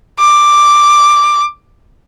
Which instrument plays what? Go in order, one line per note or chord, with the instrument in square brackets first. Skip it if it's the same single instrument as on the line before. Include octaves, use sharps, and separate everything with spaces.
[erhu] D6